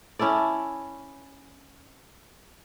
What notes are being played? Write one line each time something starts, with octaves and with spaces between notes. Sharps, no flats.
C#4 E4 A4 D5